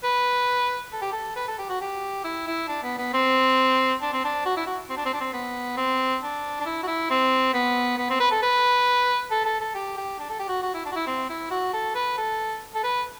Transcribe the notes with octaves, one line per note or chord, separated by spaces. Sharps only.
B4
A4
G4
A4
B4
A4
G4
F#4
G4
E4
E4
D4
B3
B3
C4
D4
C4
D4
F#4
E4
F#4
C4
D4
C4
D4
C4
B3
C4
D4
D4
E4
F#4
E4
C4
B3
B3
C4
B4
A4
B4
A4
A4
A4
G4
G4
D4
A4
G4
F#4
F#4
E4
D4
F#4
E4
C4
E4
F#4
A4
B4
A4
A4
B4